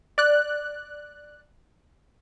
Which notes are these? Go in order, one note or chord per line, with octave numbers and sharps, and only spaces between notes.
D5 F#6